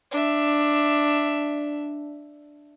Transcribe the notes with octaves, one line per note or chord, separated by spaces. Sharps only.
D4 E5